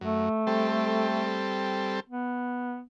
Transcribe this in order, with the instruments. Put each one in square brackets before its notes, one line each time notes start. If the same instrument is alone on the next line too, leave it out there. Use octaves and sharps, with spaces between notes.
[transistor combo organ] F#2 [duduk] A3
[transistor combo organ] G3 C4 A4
[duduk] B3